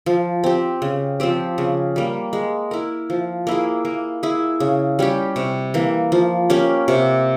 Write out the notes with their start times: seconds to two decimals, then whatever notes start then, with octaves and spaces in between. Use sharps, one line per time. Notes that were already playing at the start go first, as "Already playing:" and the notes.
0.06 F3
0.44 C4 G4
0.82 C#3
1.20 F3 C4 G4
1.58 C#3
1.96 G3 A#3
2.33 G#3
2.71 E4 A#4
3.10 F3
3.47 A#3 E4 G#4
3.85 A#3
4.23 E4 G#4
4.60 C#3
4.99 G3 C#4 G4
5.36 C3
5.74 E3 A#3
6.12 F3
6.50 A#3 C#4 G4
6.88 C3